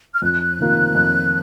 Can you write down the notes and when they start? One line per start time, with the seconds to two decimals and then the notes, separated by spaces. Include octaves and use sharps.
0.15 F6
0.22 F2 F#6
0.58 C3 D#3 A#3 F4
0.95 F2